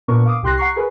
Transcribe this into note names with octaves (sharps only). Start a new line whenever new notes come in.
A#2 B3 D4 A#4 C#6
F5 D6 D#6
C2 G4 C6 F#6 A#6
F#5 A#5 C#6 C7
G#4 A#4 B4